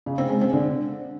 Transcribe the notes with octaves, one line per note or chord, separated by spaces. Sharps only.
C#3
C4
G#3
C4
D3